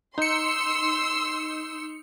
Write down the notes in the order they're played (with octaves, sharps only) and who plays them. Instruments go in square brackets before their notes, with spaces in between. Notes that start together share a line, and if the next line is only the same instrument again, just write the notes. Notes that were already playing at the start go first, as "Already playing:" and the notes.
[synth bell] D#4 C#7 [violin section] C6 E6